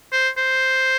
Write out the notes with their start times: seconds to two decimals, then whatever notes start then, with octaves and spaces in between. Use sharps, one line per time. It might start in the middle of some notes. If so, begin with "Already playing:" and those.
0.12 C5
0.37 C5